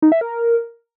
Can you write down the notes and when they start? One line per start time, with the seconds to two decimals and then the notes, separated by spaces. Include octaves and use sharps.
0.02 D#4
0.12 E5
0.21 A#4